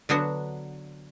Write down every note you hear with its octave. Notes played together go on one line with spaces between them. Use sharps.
D3 F#3 B3 D4 F#4